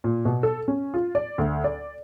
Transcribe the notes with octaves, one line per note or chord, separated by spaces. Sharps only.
A#2
B2
A4
C#4
F4
D5
D2
D5